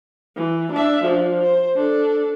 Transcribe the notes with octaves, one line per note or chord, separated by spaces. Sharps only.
E3
D4 E5
F3 D4
C5
D4 A4